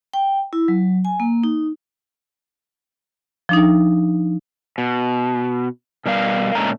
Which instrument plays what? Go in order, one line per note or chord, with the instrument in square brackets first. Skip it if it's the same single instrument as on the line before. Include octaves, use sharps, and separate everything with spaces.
[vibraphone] G5
E4
F#3
G#5
A#3
D#4
[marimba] F3 D4 D#4
[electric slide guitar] B2
B2 G3 A#4 F5
A#2 D3 G#3 A3 C#4 A#5